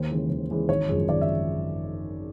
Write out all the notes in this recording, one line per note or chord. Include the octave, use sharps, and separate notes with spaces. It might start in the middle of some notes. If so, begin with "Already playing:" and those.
Already playing: D#2 C5
C#3 E3 G#3
D#2
C#3 E3 G#3
G#1 C#5
F#2 C#3 F3 G#3
G#1 D5
E5